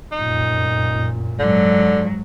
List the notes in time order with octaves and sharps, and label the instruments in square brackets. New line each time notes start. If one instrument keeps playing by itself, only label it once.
[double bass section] F1 F#2 A#2 [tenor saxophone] D#4
[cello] G#2 F#3 [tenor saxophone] D3